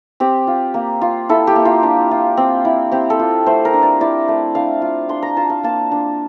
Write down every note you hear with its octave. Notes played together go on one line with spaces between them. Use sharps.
C4 G4
F4
A#3
F4
E4 A4
G4
A#3
F4
D4
F4
C4
E4
C4 G4
A4
F4
A3 C5
A#4
D4
D5
E4 D5
A3
D4 F5
F4
D4 C6
A#5
F4 A5
F5
A#3 A5
D4